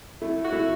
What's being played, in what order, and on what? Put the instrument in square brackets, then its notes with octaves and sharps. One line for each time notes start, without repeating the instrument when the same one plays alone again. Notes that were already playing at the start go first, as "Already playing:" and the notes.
[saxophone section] A3 [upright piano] E4
[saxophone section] F#4
[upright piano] E4